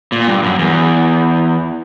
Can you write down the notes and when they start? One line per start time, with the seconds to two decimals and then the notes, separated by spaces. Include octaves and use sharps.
0.12 A#2
0.28 G2
0.43 F#2
0.59 E2